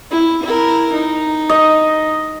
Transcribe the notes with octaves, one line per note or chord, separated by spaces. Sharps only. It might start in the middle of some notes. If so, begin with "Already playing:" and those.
E4
E4 A#4
D#4
D#5